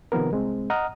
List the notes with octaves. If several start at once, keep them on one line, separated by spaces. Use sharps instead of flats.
C3 D#3 F3 B3 A#4
C2 G#3 C4
D#5 F#5 A#5 D#6 F6